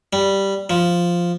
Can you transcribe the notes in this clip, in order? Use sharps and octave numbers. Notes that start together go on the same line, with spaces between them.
G3
F3